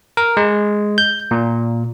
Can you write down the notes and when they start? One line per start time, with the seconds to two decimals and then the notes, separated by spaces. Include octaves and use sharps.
0.17 A#4
0.37 G#3
0.98 G6
1.31 A#2